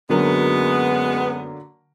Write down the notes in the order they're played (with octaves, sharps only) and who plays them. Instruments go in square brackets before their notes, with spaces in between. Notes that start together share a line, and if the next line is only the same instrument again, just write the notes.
[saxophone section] F#2 G#3 B3 [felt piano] D3 F#3 A#3